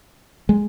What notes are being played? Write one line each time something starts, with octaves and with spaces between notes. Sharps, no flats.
G#3